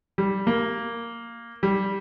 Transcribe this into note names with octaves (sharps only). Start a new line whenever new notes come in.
G3
A#3
G3